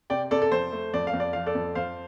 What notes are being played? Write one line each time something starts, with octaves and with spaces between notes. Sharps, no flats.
C3 D5 G5
C3 A4 D5
A4
F2 C5
A3
F2 D5
F5
F2
D5
F3 F5
A4 D5
F2
F2 C5 F5